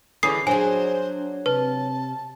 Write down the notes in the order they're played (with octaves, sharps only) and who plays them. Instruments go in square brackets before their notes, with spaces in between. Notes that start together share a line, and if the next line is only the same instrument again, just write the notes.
[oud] D3 E3 C#4 [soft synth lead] G#4 [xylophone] D#6 C7
[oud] F#3 G#4 [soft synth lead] D4 [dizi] C5 [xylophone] G#5
[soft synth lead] C3 [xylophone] B4 [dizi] A5